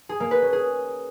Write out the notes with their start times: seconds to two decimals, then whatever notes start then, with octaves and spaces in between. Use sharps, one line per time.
0.09 G#4
0.20 A#3
0.31 B4
0.42 C#4
0.53 G#4